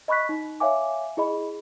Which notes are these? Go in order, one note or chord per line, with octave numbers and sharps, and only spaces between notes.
D#5 B5 C#6 F#6 B6
D#4
C#5 E5 F5 G#5 D6
E4 G#4 D#5 B5